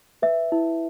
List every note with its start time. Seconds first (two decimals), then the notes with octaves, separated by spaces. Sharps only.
0.22 B4 E5
0.52 E4